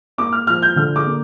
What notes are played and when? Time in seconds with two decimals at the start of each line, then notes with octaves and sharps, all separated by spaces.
0.18 A#3 D6
0.32 F6
0.47 F3 F6
0.62 G6
0.76 D3 F6
0.96 D6
1.07 A#3